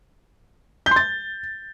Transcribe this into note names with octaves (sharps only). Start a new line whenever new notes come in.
G6
C6
A6